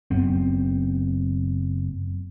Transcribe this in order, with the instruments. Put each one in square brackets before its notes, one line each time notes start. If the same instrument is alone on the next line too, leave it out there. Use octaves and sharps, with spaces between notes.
[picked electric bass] F#1 F#2 B3 C4